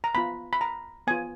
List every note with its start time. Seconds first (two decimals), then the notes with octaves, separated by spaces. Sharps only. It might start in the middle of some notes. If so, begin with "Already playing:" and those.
0.04 A#5
0.15 B3 F4 B5
0.53 B5
0.61 A#5
1.07 B3 F4 G#5